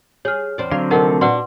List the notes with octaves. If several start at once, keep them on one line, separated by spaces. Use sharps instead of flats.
G#4 C#5 F6
E2 C4 D5
D3 F#3 C4 D5 F5
C3 F3 A3 D#4 A#4 D#5 F#5
A#2 D4 F#4 B4 D5 F#5 C6